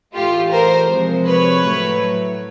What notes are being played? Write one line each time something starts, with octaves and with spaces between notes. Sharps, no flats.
A2 E3 A3 F4 G4
A#4 C5
C3 F3 G#3
B4 C#5
A2 F#3 A3